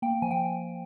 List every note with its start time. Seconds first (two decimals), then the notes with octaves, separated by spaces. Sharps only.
0.02 A#3 G5
0.22 F3 G#5
0.31 G5